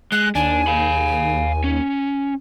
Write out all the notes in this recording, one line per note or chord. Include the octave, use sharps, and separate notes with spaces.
G#3 F#6
D#2 D4 G#5
F5 B5
C#4